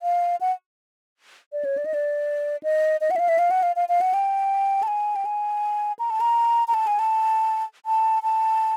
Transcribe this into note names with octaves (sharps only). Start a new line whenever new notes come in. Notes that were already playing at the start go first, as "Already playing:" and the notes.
F5
F#5
D5
C#5
D5
D#5
D5
D#5
D#5
F#5
E5
F5
E5
F5
F#5
F5
F5
F5
F#5
G5
A5
G#5
G5
G#5
A#5
A5
A#5
A#5
A5
G#5
A5
A5
A5